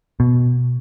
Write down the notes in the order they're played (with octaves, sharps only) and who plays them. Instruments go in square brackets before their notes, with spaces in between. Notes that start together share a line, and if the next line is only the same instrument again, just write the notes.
[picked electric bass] B2